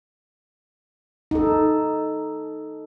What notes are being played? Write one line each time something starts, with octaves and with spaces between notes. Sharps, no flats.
D#4 A4